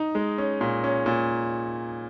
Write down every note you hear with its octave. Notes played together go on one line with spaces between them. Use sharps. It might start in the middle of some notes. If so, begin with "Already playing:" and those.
Already playing: D#4
G#3
C#4
A#2
C#4
A#2